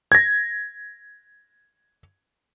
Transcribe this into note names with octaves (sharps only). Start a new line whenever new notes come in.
G#6 A#6